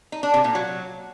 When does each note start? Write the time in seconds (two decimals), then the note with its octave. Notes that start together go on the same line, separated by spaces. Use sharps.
0.12 D#4
0.23 D4
0.34 C3
0.44 A#2
0.55 F#3